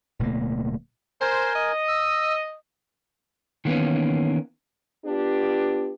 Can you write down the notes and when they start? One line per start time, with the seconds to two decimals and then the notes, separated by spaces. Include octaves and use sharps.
0.19 D1 B2 A3 A#3
1.21 A#4 C5 G#5
1.55 D#5
1.88 E6
3.65 D#3 E3 A#3 B3 C#4
5.04 B3 D4 F4 G4